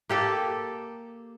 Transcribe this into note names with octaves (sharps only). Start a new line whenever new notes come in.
A#3 G4 A4